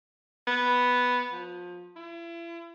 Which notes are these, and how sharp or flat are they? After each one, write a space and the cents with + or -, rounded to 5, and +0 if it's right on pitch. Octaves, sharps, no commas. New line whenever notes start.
B3 +0
F3 +25
E4 +40